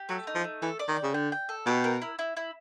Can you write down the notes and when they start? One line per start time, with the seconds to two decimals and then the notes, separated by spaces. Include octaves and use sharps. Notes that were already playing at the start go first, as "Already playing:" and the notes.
Already playing: G4
0.09 F#3 A3
0.27 D#4
0.35 F3
0.44 A3
0.62 E3 A4
0.79 D5
0.88 D#3
0.96 G5
1.03 C#3
1.14 D3 G5
1.32 G5
1.49 A4
1.66 B2 G4
1.84 A#4
2.02 E4
2.19 E4
2.37 E4